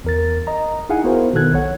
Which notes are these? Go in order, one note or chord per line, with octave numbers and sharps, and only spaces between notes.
E2 A#4 A6
D#5 A#5
D#4 E4 G#4 F5 F#5 G#5
B3 E4 F#4 A#4 C5
B2 D#3 B3 A4 F#6 G#6
B1 C#5 F#5